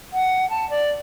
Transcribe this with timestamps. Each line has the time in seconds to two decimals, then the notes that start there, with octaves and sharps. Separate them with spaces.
0.13 F#5
0.50 A5
0.70 D5